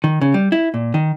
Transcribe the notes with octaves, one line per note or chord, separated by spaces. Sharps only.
D#3
C#3
G3
E4
A#2
D#3